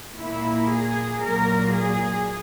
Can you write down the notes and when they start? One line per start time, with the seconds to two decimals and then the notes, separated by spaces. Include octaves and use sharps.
0.18 A#2 A#3 E4
0.70 G#4
1.22 A#2 F#3 A#3 A#4
1.74 G#4